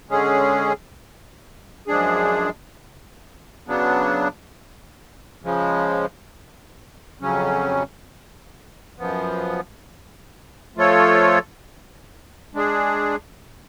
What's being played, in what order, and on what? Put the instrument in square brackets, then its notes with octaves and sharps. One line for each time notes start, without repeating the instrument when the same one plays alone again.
[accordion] D3 G#3 C#4 G#4
F#2 F3 G#3 D4 G#4
C#3 F#3 B3 D4
C#3 F3 G#3
F2 C#3 F#3 C#4
F#2 F3 B3
F3 A3 F4 A4 C#5
G#3 D4 G#4